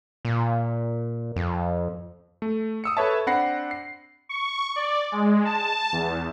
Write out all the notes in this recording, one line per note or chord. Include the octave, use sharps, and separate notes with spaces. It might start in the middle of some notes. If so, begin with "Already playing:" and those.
A#2
F2
A3
D#6 E6 C#7
A4 B4 C#5 E5 A5
C4 D4 F#5 B5 A#6 C7
C7
C#6
D5
G#3
A5
E2